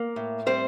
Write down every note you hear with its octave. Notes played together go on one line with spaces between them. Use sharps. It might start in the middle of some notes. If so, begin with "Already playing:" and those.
Already playing: A#3
A2
G3 C4 C5